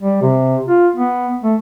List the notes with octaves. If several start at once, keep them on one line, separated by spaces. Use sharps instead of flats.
G3
C3
F4
B3
A3